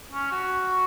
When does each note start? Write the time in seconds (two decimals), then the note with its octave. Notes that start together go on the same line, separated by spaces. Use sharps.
0.12 C#4
0.32 F#4